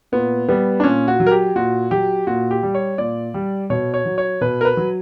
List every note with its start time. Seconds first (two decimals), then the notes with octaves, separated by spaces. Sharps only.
0.12 A#2 B3
0.49 G3 B3
0.80 D4
0.84 A#2 C#4
1.08 F#4
1.20 F#3
1.27 A#4
1.31 G4
1.56 A#2 F#4
1.91 F#3 G4
2.27 A#2 F#4
2.51 G4
2.63 G3
2.75 C#5
2.98 A#2 D5
3.34 G3
3.70 B2 C#5
3.94 C#5
4.05 F#3
4.18 C#5
4.41 B2 B4
4.61 A#4
4.65 B4
4.77 F#3